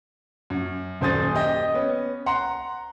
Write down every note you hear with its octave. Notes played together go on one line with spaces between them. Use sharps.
F#2
D#1 F#2 C5 G#5 D#6 A6
G4 D#5 G5
B3 C#4
F#5 A#5 C6